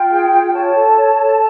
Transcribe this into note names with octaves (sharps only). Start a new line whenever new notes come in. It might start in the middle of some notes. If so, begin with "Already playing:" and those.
Already playing: F4 G5
G#4
F4
C#5 A5
A4
C#5
A4